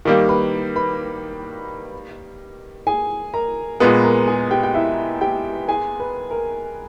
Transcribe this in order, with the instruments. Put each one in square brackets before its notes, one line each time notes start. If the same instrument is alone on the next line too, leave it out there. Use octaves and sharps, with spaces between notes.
[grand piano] D#3 G3 A#3
[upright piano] B4 B5
B4 B5
G#4 G#5
A#4 A#5
[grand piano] A#2 G#3 B3 [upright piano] B4 B5
[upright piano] A#4 A#5
G#4 G#5
G4 G5
G5
E4 E5
G4 G5
G#4 G#5
B4
A#4